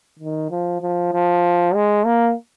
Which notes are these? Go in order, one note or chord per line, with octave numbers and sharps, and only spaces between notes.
D#3
F3
F3
F3
G#3
A#3